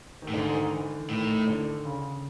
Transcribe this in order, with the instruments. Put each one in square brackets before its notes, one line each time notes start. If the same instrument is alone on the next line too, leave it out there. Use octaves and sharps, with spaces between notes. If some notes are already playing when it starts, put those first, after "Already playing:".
[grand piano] D#3
[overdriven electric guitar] A2
[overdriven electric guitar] G#2 [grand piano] D3
[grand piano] D#3
E3
[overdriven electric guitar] A2 [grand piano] D#3
[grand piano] D3
C#3